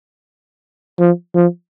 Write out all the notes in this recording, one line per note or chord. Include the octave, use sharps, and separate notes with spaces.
F3
F3